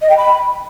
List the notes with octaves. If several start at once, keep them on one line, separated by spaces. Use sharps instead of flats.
D#5
G5
B5